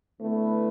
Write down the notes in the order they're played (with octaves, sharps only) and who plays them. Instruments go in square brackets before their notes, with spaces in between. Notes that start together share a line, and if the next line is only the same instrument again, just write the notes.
[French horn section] D3 B3 E4 B4 [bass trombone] A3